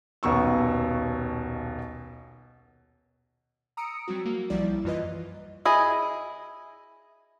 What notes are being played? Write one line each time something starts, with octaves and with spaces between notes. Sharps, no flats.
D#1 B1 B2 C#6 E6
A#5 D#6 E6 C#7 D7
F#3 G3 C4 F#4
A#3
B1 F3 G3 E4 D5
F#2 E3 F4 B4 D#5
E4 G#4 D#5